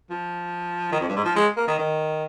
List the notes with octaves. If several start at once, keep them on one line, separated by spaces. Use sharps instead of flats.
F3
D#3
F2
G2
G#2
F3
G#3
A#3
D#3
D#3